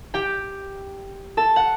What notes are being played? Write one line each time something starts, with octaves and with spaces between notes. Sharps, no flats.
G4 G5
A4 A5
F#5